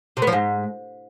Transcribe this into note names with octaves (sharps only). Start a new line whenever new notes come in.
C3
B3
F3
G#2